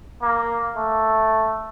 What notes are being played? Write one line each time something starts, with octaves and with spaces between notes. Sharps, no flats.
A#3
A3